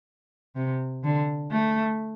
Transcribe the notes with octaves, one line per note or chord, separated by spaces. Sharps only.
C3
D3
A3